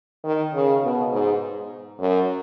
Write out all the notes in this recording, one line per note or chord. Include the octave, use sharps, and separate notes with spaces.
D#3
C#3
B2
G#2
F#2